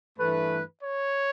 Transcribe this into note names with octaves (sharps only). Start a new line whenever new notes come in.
G2 E3 A3 B4
C#5